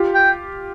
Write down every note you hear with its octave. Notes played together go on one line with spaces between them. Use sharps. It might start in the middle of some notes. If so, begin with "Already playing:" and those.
Already playing: F4 G4
G5